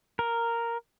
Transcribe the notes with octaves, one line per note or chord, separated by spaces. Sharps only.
A#4